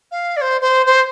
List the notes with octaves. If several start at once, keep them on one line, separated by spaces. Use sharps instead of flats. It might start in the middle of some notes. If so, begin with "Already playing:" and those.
F5
D5
C5
C5
C5